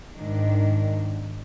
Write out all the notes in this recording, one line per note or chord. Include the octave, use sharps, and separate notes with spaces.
G#2 D#3 D4